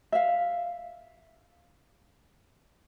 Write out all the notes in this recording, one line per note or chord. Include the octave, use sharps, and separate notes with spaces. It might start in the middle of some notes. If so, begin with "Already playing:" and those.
E5 F5